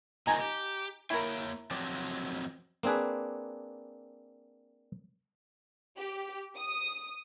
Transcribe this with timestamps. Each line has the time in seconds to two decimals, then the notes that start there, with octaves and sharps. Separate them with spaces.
0.27 A#2 D#3 C4 D#4 G#5 A#5
0.40 G4
1.10 A#3 E4 A#4 C#5 G5
1.71 F3 F#3 C4 D5
2.83 A#3 C4 D4 G#4 B4
5.97 G4
6.55 D#6